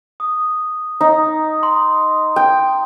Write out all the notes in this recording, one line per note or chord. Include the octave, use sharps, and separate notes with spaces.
D#6
D#4
C6
G5